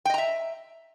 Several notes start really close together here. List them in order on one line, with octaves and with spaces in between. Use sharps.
G5 D#5 A#5 E5